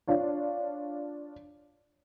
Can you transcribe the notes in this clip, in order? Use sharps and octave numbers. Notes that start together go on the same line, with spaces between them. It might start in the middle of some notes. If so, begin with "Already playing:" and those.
D4 F4 C#5